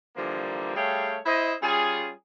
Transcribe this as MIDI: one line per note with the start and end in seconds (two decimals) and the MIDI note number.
0.16 0.75 50
0.16 0.75 52
0.16 0.75 53
0.16 0.75 55
0.16 0.75 58
0.75 1.18 55
0.75 1.18 57
0.75 1.18 68
0.75 1.18 73
0.75 1.18 77
0.75 1.18 79
1.25 1.54 64
1.25 1.54 72
1.25 1.54 75
1.61 2.11 55
1.61 2.11 61
1.61 2.11 65
1.61 2.11 68